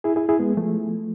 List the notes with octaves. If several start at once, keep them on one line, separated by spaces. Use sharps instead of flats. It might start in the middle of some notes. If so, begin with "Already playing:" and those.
E4 G#4
E4 G#4
E4 G#4
G#3 B3
F3 A3